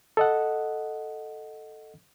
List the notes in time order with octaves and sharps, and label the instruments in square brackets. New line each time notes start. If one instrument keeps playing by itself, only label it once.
[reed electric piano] A4 D#5 F#5